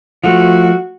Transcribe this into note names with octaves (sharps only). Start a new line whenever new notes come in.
F3 A3 F#4